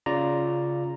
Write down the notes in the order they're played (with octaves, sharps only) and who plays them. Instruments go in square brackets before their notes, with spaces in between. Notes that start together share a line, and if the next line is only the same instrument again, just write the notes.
[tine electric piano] C#3 F4 D5 A#5